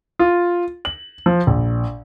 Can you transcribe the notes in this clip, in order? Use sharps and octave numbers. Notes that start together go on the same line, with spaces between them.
F4
F#7
F3
A#1